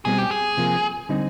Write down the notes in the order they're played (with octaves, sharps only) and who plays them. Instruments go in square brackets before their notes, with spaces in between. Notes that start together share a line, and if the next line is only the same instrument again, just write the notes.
[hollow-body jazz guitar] B2 G3 C4 [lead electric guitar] G#4
[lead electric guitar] G4
G#4
[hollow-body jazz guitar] C3 F3 A#3
D3 G3 C4 D#4